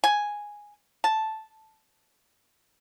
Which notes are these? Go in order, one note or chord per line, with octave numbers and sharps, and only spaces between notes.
G#5
A5